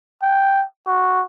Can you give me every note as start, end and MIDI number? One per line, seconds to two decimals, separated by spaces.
0.22 0.64 79
0.87 1.23 66